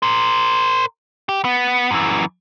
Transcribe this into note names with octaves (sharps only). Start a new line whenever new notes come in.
A#4 C5
G4
B3
F#2 E3